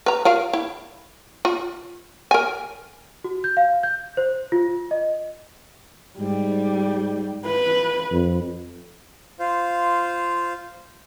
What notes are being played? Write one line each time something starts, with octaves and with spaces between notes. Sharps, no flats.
B4 A#5
F4 A#4 F5
E4
F4
A#4 G#5
F#4
G6
F5
G6
C5
F4
D#5
G#2 G3
B4
F2
F4 C5 F5